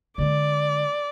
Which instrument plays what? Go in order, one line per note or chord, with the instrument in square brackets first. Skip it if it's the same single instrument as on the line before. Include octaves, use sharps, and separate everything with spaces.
[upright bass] D3 G#3 [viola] D5